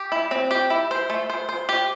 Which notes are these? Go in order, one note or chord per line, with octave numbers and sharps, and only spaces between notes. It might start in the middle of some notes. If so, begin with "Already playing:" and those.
Already playing: G4
E4
C4
G4
E4
C5
A3
C5
C5
G4